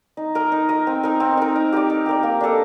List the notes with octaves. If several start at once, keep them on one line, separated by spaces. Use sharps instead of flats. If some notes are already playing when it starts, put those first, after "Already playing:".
D#4
A#4 D#5
D#4
A#4 D#5
C4
D#4 A#4
C4
D#4 A#4
D#4
G4 A#4 D5
D#4
G4 A#4 D5
A#3
D4 A4 D#5